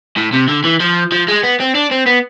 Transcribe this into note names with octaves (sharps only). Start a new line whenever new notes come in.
A2
C3
D3
E3
F3
F3
G#3
B3
C4
D4
C4
B3